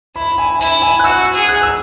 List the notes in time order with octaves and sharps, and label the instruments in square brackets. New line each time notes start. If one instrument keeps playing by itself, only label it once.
[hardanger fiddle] E4 [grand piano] B5
[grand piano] B5
G#5
[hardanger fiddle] E4 [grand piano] B5
[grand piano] G#5
F#6
[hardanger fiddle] F#4 [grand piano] E6
[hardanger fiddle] G#4
[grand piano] F#6
E6